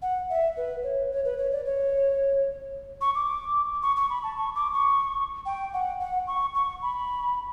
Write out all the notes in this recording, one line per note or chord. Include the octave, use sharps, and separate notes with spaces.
F#5
E5
B4
C#5
C#5
B4
C#5
D5
C#5
C#6
D6
C#6
C#6
B5
A5
C#6
D6
C#6
G5
F#5
F#5
C#6
C#6
B5